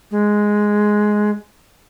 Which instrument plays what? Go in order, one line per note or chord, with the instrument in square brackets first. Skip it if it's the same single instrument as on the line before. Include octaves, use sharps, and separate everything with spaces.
[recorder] G#3